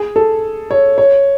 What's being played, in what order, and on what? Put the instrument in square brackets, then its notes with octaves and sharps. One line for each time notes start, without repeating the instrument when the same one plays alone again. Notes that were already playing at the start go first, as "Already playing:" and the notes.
Already playing: [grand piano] G#4
A4
C#5
C#5